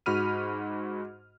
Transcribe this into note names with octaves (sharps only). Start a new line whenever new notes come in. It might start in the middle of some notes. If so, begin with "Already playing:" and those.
G#2 F#4 B5 F6 D#7